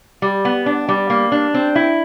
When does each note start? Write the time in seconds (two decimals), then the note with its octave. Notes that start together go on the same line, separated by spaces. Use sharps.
0.22 G3
0.45 B3
0.66 D4
0.88 G3
1.10 A#3
1.32 D4
1.54 C4
1.76 E4